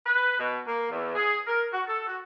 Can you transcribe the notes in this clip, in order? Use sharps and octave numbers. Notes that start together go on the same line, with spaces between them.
B4
B2
A#3
E2
G#4
A#4
F#4
A4
F#4